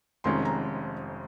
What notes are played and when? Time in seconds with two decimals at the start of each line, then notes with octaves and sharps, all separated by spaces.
0.24 F1 F2 D#3 G#3 C#4 C6
0.45 A#5